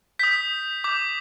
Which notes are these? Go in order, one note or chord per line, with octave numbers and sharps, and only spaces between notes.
D#6 G6 B6
D6 G6